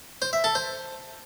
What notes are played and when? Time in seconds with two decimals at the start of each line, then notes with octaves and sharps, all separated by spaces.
0.22 C5
0.33 E5
0.44 A4
0.55 C5